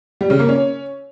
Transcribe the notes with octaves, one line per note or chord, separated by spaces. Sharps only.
G3
C#3
A#3
C#4